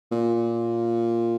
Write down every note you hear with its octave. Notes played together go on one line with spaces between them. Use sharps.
A#2